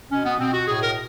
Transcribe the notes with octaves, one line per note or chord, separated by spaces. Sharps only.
B2 C#4
B3
B2 C4
F#4
A2 G#4
A#4